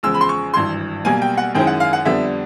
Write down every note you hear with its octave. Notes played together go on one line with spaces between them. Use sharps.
E2 C#3 F3 G#3 E6
B5
C6
C#6
G#1 G2 E3 C6
B1 B2 G3 A#3 G#5
G5
F#5
F#2 D#3 G#3 C#4 E4 G5
F#5
F5
F#5
F2 D3 G3 B3 D4 E5